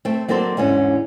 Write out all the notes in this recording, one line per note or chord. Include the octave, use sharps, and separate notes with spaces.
A3 C4
F#3 A#3 C4 A4 C5 D5
E2 G#2 D3 C#4